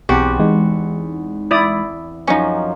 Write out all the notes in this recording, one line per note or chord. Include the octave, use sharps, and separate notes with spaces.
B1 E2 C4 F#4 G4 A5
E3 G#3 D#4
E4 D5 D#6
F#2 F3 C#4 D#4